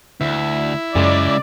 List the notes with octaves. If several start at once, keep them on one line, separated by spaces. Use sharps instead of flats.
D2 E4
F#2 C#3 G#3 D5